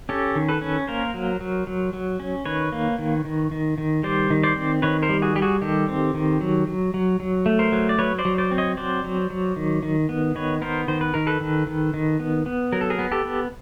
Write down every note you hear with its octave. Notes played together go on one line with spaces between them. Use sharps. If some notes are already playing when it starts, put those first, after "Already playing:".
C#4 G4 A4
D#3
A4 B4
C#4
A#3 A#4 C5
F#3
F#3
F#3
F#3
C#4
D#3 B4 C#5
A#3
D#3
D#3
D#3
D#3
G3 C5 D5
D#3
C5 D5
C4
D#3 B4 C#5
A#4 C5
G3
F#4 G#4
G3 G4
F#4 G#4
D#3 G4 A4
C4
D#3
F#3
F#3
F#3
F#3
A3
A#4 C5
F#3
D5
F#3 B4 C#5
C5 D5
F#3
C5 D5
C4
C#5 D#5
F#3 C5 D5
F#3
F#3
D#3
D#3
B3
D#3 B4 C#5
B3 A#4 C5
D#3 C5
B4
D#3 A#4
A4 B4
D#3
D#3
D#3
B3
B3
F#3 A#4
A4
G#4 A#4
B3
G4 A4
B3